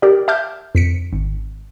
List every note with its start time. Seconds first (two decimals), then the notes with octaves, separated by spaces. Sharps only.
0.02 G4 A#4 D5
0.28 E5 A5 D6 F6 G6
0.75 F2 B6 C#7
1.13 G#1